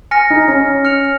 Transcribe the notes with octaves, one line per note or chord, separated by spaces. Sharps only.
G#5 F6 A#6 C#7
D#4
C#4
F6 C#7 F7